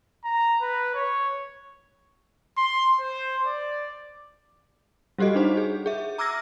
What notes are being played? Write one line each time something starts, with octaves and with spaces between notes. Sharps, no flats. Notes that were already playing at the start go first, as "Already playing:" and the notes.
A#5
B4
C#5
C6
C5
D5
G3 F#4 G4 A4 D#5
D4 D#4 C5
G#4
G#4 E5
A#5 D6 E6 F6 G#6 A#6